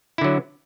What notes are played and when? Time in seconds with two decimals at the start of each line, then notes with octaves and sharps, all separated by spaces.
0.18 E4
0.21 D3
0.24 F#3